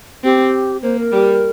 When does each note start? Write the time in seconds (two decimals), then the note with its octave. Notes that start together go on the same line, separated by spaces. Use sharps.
0.24 C4 G4
0.82 A#3 C5
0.98 A#4
1.12 G3